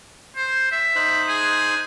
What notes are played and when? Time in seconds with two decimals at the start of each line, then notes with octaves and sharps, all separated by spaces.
0.36 C5
0.71 E5
0.96 D#4 C5 F#6
1.28 G#4